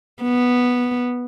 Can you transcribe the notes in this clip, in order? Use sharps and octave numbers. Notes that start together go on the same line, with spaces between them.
B3